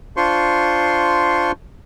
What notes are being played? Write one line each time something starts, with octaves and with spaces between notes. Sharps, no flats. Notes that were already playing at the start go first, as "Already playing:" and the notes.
D4 F4 C5 C6 C#6